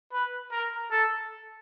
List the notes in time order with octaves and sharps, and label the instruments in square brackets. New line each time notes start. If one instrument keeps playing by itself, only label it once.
[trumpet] B4
A#4
A4